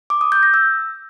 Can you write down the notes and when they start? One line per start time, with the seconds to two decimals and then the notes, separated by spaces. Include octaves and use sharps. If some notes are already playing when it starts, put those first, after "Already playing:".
0.10 D6
0.21 D#6
0.32 G6
0.43 A#6
0.54 E6